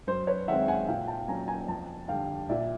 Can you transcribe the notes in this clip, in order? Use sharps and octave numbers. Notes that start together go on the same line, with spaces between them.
F#2 C5
B4 C#5
D#3 G#3 C4 E5 F#5
F#5 G#5
A#2 F5 G5
G5 A5
F#3 A#3 C#4 G#5 A#5
G#5 A#5
F2 G5 A5
D3 G3 F5 G5
A#2 D5 E5